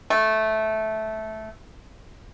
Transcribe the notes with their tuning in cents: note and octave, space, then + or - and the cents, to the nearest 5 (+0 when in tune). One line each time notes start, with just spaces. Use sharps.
A3 -10